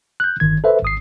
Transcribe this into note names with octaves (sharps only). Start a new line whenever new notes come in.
F#6 G6
G1 D#3 G#6
A4 B4 C5 E5
G#1 D#6 C7